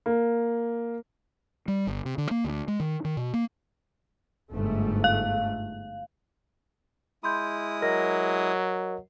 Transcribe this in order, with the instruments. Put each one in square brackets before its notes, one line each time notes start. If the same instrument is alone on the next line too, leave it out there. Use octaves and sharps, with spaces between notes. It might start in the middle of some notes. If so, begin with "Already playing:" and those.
[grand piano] A#3
[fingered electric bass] G3
G1
C3
D3
A#3
D2
G#3
D#3
D#3
B2
A#3
[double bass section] G1 G#2 A3
[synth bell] F5
[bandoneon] G#3 E4 D#6 [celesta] B5 C6 G6
[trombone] F#3 [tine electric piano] A#4 D#5 [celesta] A#6